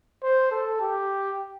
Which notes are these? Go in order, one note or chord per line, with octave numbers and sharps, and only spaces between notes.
C5
A4
G4